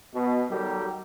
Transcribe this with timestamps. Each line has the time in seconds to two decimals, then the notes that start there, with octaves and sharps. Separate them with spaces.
0.14 B2
0.51 D#3 F#3 G3 G4 A4 A#4